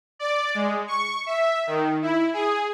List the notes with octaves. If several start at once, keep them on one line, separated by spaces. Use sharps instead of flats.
D5
G#3
C#6
E5
D#3
E4
G#4